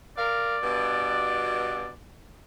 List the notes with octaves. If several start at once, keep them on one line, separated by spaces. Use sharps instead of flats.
A#4 D5 F5
G2 B2